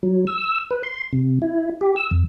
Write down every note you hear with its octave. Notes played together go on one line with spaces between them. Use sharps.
F#3
E6
B4
C6
C3
E4
G4
E6
F2